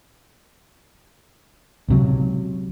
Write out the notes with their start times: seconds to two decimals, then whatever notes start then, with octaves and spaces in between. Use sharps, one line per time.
1.89 C#2 C3 F#3